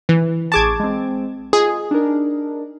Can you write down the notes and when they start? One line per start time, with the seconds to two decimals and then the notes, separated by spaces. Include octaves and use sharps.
0.09 E3
0.52 A1 G#4 A5 C#6 D6 G#6
0.80 G#3 C4
1.53 F4 G#4 D#5
1.91 D4 D#4 A#4